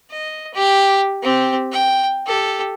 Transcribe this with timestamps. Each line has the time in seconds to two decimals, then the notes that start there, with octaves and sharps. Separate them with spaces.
0.11 D#5
0.54 G4
1.23 C4 G4
1.72 G5
2.26 G4 A4